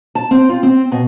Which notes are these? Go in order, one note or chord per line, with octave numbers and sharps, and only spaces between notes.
A5
C4
F4
C4
B2